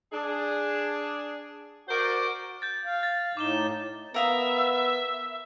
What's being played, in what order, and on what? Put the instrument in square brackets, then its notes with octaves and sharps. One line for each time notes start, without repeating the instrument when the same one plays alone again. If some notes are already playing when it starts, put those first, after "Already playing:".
[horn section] D4 G#4
F#4 A#4 C5 D5
[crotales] G6 A6
[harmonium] F5
[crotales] A6
[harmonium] A2 D#4 [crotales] D6 E7 G7
[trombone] B3 [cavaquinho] A#4 F5 D#6 [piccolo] E5